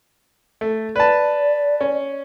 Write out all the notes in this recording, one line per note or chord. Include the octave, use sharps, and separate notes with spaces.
A3
B4 D5 A5
C#4